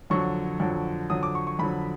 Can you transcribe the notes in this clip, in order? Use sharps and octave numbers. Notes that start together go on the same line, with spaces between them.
F2 D3 F#3 C#6
F2 D3 F#3
F2 D3 F#3 D#6
D6
C#6
C#6
F2 D3 F#3 B5